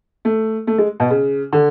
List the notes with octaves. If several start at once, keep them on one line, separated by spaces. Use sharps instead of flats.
A3
A3
G#3
B2
C#3
D3